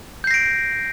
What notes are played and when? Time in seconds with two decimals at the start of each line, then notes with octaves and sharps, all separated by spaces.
0.24 G6
0.27 C7
0.31 A#6
0.34 D7